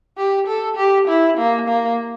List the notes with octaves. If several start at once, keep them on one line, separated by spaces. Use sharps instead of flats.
G4
A4
G4
E4
A#3
A#3